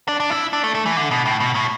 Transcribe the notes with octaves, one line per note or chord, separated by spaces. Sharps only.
D4
D4
E4
D4
A3
A3
E3
D3
B2
A2
B2
A2